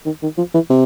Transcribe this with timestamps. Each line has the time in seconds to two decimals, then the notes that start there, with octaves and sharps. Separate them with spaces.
0.06 D#3
0.23 D#3
0.38 F3
0.54 E3
0.70 C3